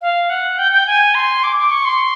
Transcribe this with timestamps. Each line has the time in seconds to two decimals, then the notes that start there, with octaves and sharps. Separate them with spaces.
0.02 F5
0.30 F#5
0.58 G5
0.72 G5
0.87 G#5
1.15 C6
1.43 D6
1.57 D6
1.71 C#6
1.85 C6